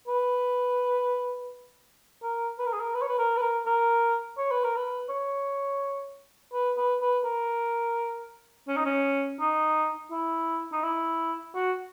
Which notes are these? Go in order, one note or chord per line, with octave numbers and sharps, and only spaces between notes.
B4
A#4
B4
A#4
G#4
A#4
B4
C#5
B4
A#4
B4
A#4
A#4
C#5
B4
A#4
B4
C#5
B4
B4
B4
A#4
C#4
D#4
C#4
D#4
E4
D#4
E4
F#4